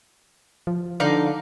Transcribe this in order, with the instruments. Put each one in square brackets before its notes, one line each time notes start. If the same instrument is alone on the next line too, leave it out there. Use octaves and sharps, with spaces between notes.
[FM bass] F3
[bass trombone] D3 [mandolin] D#4 D5 F5